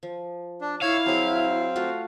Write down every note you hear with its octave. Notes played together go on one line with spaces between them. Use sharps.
F3
D4
E4 C#5 D5 F5 E6
F#3 C4 G#4
A3 F4 F#4